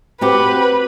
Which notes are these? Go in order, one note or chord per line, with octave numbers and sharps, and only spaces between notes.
C4 F#4 G4 B4